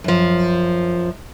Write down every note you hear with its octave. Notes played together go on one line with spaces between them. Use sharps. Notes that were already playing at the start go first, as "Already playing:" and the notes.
F#2 F3